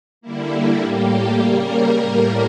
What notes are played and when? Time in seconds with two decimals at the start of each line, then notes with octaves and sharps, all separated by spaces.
0.21 D3 G3 A#3 E4
0.51 E4
0.81 A2 G3 A#3 G4
1.41 C#3 G3 A#3 A#4
2.01 A2 G3 A#3